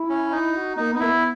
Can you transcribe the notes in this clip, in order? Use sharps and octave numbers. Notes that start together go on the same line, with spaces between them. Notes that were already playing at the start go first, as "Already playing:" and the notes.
Already playing: E4
C#4
D#4 E4
F#4
A#3 D#4
B3 D#4
A#3 E4
B3